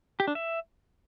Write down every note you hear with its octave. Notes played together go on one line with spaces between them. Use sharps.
G4
D4
E5